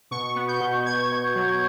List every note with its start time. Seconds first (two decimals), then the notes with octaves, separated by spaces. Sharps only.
0.11 B2 C#6
0.35 B3
0.48 G6
0.60 B2
0.86 B2 G#6
1.12 B2
1.35 F#3